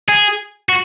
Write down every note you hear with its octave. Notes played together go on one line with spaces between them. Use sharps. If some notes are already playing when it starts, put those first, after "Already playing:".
G#4
F#4